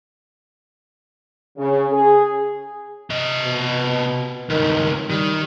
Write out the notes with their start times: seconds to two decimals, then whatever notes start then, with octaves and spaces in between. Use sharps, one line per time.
1.57 C#3
1.92 G#4
3.10 C3 D#5
3.42 B2
4.49 C#2 G2 D#3
5.10 D#3 G3